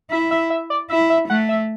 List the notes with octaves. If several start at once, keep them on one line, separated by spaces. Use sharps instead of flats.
E4 E5
E5
E5
D5
E4 E5
E5
A3 F#5
E5